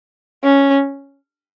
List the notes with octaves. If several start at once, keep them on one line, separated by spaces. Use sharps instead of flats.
C#4